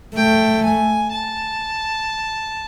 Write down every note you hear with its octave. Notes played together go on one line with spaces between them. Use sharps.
A3 G5
G#5
A5